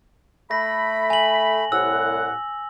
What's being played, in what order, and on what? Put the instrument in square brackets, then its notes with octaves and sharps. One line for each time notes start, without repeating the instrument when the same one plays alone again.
[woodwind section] A3 B5 [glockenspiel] A#6
[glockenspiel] G#5 F#7
[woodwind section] C2 A2 F#5 [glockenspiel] E6